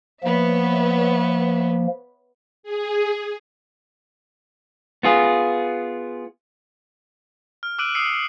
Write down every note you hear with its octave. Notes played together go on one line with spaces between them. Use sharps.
F3 A#3 B3 C#5 E5
G#4
B3 F4 G#4
F6
D6 E6 F#6 D7 D#7 F#7
D#6 E6 C7 C#7 D#7
F#7